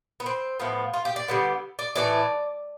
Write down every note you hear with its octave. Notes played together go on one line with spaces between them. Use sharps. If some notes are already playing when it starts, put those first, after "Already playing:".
B3
C4
A2 F3 B3
F4
G4
D5
D3 G3 B3
D5
A2 E3 A3 D5